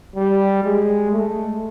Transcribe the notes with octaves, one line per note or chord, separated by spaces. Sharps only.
G3
G#3
A3